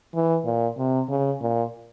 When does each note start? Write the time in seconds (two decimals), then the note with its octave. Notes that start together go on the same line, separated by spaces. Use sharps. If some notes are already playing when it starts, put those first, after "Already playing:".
0.14 E3
0.45 A#2
0.78 C3
1.09 C#3
1.41 A#2